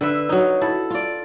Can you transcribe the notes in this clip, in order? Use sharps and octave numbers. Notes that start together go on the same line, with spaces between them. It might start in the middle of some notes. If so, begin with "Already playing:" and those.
D3 B4 E5
F#3 D#4
E4 A4
F4 D5